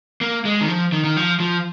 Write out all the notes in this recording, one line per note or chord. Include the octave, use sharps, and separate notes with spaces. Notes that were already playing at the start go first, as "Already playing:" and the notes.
A#3
G#3
D#3
F3
D#3
D#3
F3
F3